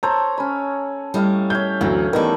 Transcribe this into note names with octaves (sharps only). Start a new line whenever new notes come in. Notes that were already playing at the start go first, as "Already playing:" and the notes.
A4 C5 C#5 A#5
C#4 B5
A2 G3 E4 F5
C#5 E5 F5 G6
D2 E3 F#3
D#3 E3 G3 A3 B3 E4